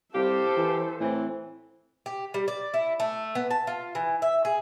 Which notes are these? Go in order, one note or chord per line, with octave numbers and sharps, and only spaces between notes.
C2 G4 A4 C5 F5
E3
A2 E3 C4
G4
G3
D5
E4
A3
B3
A5
F4
E3
E5
G#4